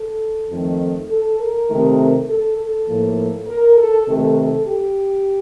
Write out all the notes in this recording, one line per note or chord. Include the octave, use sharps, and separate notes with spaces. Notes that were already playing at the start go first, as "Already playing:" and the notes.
Already playing: A4
F2 D#3 A3
A4
A#4
C3 D#3 A3
A4
A4
A2 F3 A#3
A#4
A4
C3 D#3 A3 A4
A4
G4